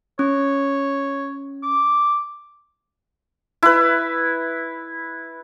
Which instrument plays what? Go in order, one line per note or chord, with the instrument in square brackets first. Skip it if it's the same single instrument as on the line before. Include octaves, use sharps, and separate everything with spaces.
[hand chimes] C#4 [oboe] C#5
[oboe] D6
[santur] E4 B4